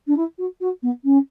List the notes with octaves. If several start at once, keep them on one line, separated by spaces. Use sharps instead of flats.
D4
E4
F#4
F#4
B3
C#4